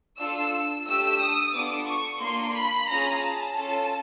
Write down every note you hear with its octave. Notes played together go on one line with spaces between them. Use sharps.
D4 F4 A4 E6
A3 D4 G4 E6
D#6
B3 D4 F4 A4 D6
C#6
A#3 D4 F4 C6
B5
C#4 F4 G#4 A#5
A5
C#4 F4 A4